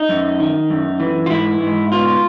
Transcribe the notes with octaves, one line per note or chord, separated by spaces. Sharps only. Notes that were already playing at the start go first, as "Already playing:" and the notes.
Already playing: D#4
F#2
D#3
F#2
E3
F4
G#2 E4
G#2
B2 F4